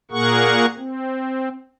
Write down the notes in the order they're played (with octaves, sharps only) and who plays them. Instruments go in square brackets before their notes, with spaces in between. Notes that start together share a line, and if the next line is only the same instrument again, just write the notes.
[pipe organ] A#2 A#3 G#4 A#4 F#5 C#6
C4